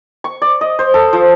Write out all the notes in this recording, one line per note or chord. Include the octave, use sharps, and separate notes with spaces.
C#6
D5
D#5
C5
A4
F3